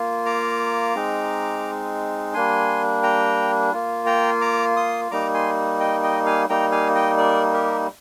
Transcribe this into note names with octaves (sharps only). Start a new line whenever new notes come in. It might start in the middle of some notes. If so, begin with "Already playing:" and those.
Already playing: A#3 F4
A#5 D6
G#3 C4 D#4
G3 A#3 D4 G#5 C6
G5 A#5
A#3 F4
G5 A#5
A#5 D6
C6 D#6
G3 A#3 D#4 A#5 D6
G#5 C6
D#5 G5
D#5 G5
F5 G#5
G3 A#3 D#4 G5 A#5
F5 G#5
D#5 G5
A#4 D5
G4 A#4